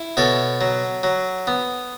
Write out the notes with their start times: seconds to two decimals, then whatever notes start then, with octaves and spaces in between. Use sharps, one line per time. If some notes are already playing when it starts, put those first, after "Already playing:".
Already playing: E4
0.17 B2 A4 C#5
0.61 F#3
1.03 F#3
1.47 B3